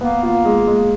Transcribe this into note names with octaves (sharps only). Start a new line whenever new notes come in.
A#3 B3
F4
G#3
G#3